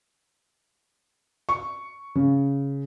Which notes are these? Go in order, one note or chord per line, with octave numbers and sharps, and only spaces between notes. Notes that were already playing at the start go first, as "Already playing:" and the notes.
C#6
C#3